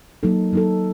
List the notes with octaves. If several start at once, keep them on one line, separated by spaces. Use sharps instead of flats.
F#3 A#3 D#4 A4
F#3 A#3 D#4 A4